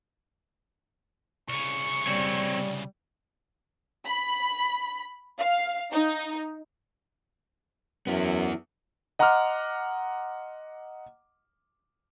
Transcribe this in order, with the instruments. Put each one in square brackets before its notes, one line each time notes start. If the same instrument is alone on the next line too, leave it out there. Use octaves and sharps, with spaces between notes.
[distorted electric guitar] C2 C#3 [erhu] C#6
[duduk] G3 [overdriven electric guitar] C4 C#5
[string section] B5
F5
D#4
[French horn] F#2 [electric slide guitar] B3 E4
[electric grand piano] D#5 F#5 A#5 C6 D6 F6